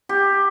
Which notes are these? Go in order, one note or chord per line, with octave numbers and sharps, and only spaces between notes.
G4